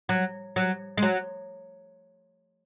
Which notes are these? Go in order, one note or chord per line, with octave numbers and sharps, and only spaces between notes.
F#3
F#3
G#3
F#3